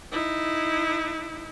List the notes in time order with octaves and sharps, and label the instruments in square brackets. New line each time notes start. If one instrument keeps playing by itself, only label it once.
[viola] D#4 E4